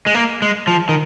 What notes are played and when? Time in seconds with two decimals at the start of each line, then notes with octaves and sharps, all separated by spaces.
0.06 G#3
0.15 A#3
0.42 G#3
0.67 F3
0.89 D#3